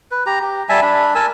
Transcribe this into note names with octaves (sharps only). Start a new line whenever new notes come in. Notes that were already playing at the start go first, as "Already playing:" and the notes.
B4
G4 A#5
G4
G3 E5 G#5 A5
D4 B5
A#4 G#5 A5 E6